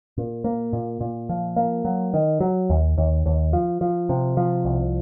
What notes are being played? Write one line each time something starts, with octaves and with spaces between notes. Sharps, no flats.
A#2
A#3
A#2
A#2
F3
A#3
F#3
D#3
F#3
D#2
D#2
D#2
F3
F3
C3
F3
C2